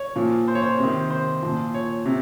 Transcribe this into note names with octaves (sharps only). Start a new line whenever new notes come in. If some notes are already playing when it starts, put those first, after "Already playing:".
Already playing: C#5
A#2 F3
C5
C#5
C5
C3 D#3
C5
A#2 F3
C#5
C3